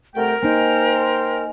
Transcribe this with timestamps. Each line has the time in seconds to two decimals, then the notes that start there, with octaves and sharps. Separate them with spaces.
0.15 C2 A3 A4 A#4 F#5 G5
0.43 A#3 D#4 C5 D#5 G5 G#5